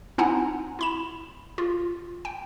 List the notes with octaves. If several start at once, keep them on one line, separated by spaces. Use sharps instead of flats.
C4 D#4 E4 F#5 G#5 A#5
E4 B5 E7
F4
G5